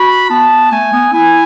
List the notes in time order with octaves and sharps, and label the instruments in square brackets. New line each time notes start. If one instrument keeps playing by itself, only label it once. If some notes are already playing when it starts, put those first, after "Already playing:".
Already playing: [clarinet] F#4 [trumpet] B5
[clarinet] B3 [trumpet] A5
[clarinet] A3 [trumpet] G#5
[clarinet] B3
[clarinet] E4 [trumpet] G#5